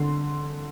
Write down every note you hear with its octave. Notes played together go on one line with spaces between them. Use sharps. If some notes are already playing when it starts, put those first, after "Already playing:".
Already playing: D3 C6